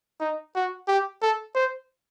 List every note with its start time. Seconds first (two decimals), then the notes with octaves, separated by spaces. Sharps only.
0.20 D#4
0.55 F#4
0.88 G4
1.22 A4
1.55 C5